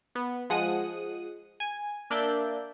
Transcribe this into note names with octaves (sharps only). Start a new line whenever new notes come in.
B3
F3 G#3 F#5 D#6 D#7
G#5
A#3 D4 D5 E5 G6